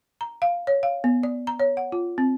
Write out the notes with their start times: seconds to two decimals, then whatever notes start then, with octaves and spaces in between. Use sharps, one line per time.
0.21 A#5
0.42 F5
0.67 C#5
0.83 F5
1.04 B3
1.23 D5
1.47 A#5
1.60 C#5
1.77 F#5
1.92 F4
2.18 C4